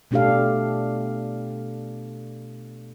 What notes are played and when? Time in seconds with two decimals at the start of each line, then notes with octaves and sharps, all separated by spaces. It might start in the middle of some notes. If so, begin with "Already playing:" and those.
0.11 B2 A3 D4 G4 A4 F5